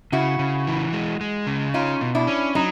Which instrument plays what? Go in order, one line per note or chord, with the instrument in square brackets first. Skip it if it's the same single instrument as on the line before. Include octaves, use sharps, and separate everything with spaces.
[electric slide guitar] C#3 [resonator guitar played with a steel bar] E4 F#4
[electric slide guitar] C#3
E3
G#3
G#3
C#3
[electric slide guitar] C#4 [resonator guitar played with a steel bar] D#4 F4
[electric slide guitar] B2
[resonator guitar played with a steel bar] D4 E4
[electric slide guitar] C#4
[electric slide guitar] F#3 [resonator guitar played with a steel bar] C#4 D#4